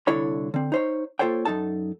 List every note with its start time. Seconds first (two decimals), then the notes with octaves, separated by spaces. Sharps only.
0.07 C2 D3 E4 A4 C#5 B5
0.54 D3 C4
0.72 D#4 C5 C#5
1.19 A#3 F4 A4 C5 C#5 G5
1.45 F#2 C#3 D#4 A4 A5